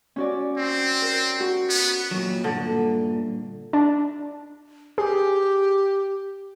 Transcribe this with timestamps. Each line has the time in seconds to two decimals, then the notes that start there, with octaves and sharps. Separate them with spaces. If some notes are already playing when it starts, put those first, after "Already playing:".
0.16 C#4 F#4 D5
0.58 C4
1.02 A#4
1.40 F#4
1.70 B3
2.11 A#2 F#3
2.44 G2 A#2 D3
3.73 D4
4.98 G4 G#4